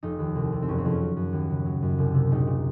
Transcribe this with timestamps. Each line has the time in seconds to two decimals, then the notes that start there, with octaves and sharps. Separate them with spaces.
0.03 F1 D#4
0.19 D#2
0.35 C2
0.52 C3
0.63 C4
0.68 F#1 C#4
0.78 C4
0.85 F2
0.90 C#4
1.01 F#3
1.17 F#2
1.33 D#2
1.50 C#3
1.66 F#3
1.82 F#2
1.98 C2
2.14 C3
2.31 A#1 D#4
2.47 A#2